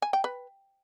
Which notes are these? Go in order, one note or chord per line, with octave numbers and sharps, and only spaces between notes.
G#5
G5
B4